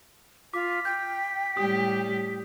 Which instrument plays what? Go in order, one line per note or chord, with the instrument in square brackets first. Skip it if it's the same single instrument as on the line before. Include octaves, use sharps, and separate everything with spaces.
[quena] F4 [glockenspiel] D6 [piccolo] B6
[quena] G5 [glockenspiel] G6
[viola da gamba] A2 G3 G4 [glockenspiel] D#6